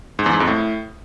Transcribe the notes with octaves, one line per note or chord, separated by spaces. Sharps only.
G#2
E2
G#2
F2
A2